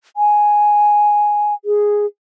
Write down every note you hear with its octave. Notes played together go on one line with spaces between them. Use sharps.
G#5
G#4